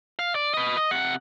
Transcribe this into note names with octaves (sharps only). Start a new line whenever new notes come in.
F5
D5
B4 D#5
D#5
C3 F#5